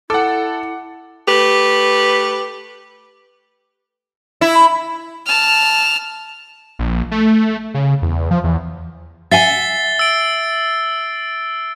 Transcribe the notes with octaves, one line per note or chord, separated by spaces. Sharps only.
E4 A4 F#5 D6
A3 G4 B4
E4
B5
A5 F6
A#1
A3
C#3
E2
F3
E2
E5 F#5 G#5 A6 C7 G7
E6 D7